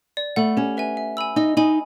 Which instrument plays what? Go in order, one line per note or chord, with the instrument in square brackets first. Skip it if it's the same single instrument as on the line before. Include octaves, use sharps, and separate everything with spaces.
[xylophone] D5
[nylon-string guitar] A3 [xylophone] F#5 B5
[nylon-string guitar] C#4 [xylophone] G4
[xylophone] B4 E5 G#5
E5
G#5 B5 E6
[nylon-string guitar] D#4 [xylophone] D#5
[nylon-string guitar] D#4 [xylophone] G#5 B5 D#6